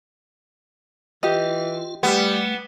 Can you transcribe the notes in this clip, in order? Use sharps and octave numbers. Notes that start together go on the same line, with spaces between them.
E3 F4 G4 D#5
G3 A3 B3